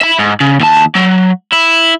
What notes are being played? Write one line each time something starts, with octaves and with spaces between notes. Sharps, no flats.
E5 B5
G#2
C#3
D#2 A5
F#3
E4